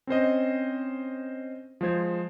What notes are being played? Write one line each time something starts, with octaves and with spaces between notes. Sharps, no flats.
C4 C#4 C5 D#5
F3 G#3 C5 G#6